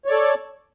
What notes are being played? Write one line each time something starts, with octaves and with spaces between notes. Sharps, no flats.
A4 C#5 D5